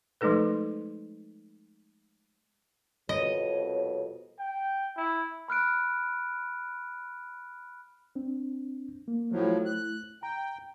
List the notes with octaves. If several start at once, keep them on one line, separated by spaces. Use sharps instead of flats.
F3 G#3 A3 D#4 A4 B4
C2 F2 B2 C#5 D#5
G5
E4
B5 F6 F#6 D7
C4 D4
A#3
A2 F3 F#3 A3 E4
F#6
G5 A#5